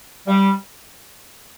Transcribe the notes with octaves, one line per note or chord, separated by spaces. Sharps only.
G3